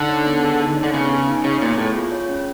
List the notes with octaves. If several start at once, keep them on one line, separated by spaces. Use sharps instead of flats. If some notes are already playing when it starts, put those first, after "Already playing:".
Already playing: D3 D#4
C#5
B3
G#4
D#4
C#5
D3
C#3 B3
G#4
D#4
C#3 C#5
A#2 B3
A2 G#4
F4
C#5
C#4